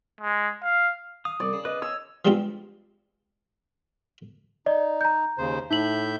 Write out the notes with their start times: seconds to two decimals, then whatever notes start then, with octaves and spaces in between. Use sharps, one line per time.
0.21 G#3
0.62 F5
1.25 F5 D#6
1.40 C2 D5
1.53 C#3
1.65 B4 D#5
1.82 C#5 E6
2.25 E3 G3 G#3 C4 D4 F4
4.66 D#4 D5 D#5
5.01 A#5 G6
5.38 D#2 C#3 C5
5.71 A2 D#4 E5 G6 F#7